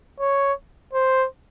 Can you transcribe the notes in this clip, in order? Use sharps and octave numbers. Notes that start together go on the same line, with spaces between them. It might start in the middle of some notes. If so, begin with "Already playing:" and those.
C#5
C5